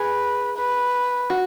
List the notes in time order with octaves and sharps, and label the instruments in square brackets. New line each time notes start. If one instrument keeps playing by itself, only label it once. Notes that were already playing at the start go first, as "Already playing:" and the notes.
Already playing: [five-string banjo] G#4 [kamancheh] B4
[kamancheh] B4
[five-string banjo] F#4